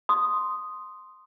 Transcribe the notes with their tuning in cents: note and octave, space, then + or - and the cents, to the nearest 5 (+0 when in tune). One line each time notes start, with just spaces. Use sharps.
C6 +0 D#6 +0